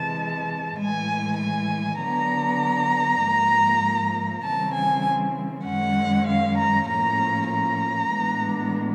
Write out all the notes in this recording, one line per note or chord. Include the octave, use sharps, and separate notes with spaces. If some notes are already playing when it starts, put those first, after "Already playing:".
Already playing: C3 E3 G#3 A5
A2 E3 G#3 G#5
G#5
D3 F#3 B3 D4 A#5
G#2 F3 A#3
C#3 E3 G3 C4 A5
G#5
F#2 D#3 G#3 C#4 F#5
F5
A#5
A2 F3 A#3 C#4 A#5
A#5
A2 E3 G#3 B3 D4